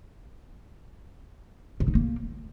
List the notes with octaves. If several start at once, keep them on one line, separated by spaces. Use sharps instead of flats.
C3
D#4
A#3